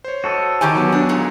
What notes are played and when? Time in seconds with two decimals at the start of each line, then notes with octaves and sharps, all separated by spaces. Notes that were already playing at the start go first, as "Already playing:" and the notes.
0.04 C5 C#5
0.24 F#4 A4 D#5
0.61 D#3 G4 G#5
0.75 F#3 B3
0.93 D4
1.09 A#2 G#3